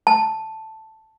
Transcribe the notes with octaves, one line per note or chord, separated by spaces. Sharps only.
A5